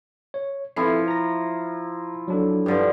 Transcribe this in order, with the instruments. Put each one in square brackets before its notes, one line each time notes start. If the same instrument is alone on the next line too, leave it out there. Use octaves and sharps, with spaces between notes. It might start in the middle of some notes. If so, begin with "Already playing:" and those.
[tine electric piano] C#5
[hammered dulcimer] F3 E4 [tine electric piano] C4 A4 C7
[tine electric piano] A#5 A#6
F#3 D4 A4
[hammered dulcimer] G2 D3 F3